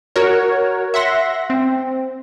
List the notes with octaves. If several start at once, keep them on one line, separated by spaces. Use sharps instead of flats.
F#4 A#4 C#5
E5 F#5 C6 A#6
C4